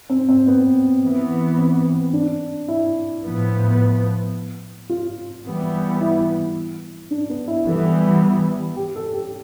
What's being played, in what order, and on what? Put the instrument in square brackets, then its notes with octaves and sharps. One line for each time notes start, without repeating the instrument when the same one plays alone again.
[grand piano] C4
C4
B3
[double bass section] E3 B3
[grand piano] C4
D4
E4
[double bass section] A2 F3 B3
[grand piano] F4
[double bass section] E3 G3 B3
[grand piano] E4
D4
B3
E4
[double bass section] E3 G3 B3 [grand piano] A4
[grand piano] G4
A4
G4